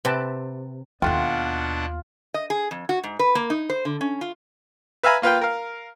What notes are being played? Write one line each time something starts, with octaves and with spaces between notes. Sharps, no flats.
C3 B4 G5 A5
D#2 B2 A3 B3 D4 F4 F#5 G5
D#5
G#4
F2
F#4
G#2
B4
A#3
D#4
C5
D3
C#4
F4
B4 E5 F5 G#5 A#5 B5
A#3 F4 B4 F5 G5
A#4 F5